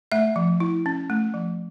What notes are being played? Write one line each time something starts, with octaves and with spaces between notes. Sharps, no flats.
A3 E5
F3
E4
C#4
A3
F3